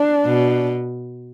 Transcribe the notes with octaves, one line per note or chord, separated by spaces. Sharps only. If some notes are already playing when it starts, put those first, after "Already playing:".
Already playing: D4
B2